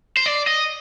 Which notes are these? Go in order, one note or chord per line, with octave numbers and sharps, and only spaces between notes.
C5
D5
D#5